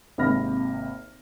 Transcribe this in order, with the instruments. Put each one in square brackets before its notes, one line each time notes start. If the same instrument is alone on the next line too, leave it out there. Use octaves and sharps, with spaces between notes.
[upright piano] G#1 C3 A#3 B5 F6 A#6